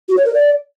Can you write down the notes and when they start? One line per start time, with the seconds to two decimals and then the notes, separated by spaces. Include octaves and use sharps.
0.08 F#4
0.17 C#5
0.25 A#4
0.33 D5